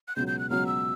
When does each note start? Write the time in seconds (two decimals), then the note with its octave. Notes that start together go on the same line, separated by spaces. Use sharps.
0.08 F#6
0.16 C#2 B2 F#3 G6
0.27 G6
0.39 F#6
0.50 C#2 B2 F#3 F6
0.67 E6